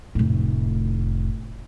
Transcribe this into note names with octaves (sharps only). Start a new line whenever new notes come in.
F1 A2